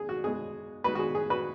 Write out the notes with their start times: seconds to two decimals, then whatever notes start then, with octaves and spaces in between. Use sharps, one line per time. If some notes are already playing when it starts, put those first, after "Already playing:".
Already playing: B1 G#4
0.09 F#4
0.24 B1 B2 G#3 G#4
0.84 B1 B2 G#3 F#4 B4
0.95 F#4
0.99 G#4
1.15 G#4
1.30 F#4 B4